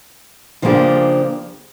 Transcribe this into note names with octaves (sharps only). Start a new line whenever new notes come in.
C#3 F3 A#3 D4 G4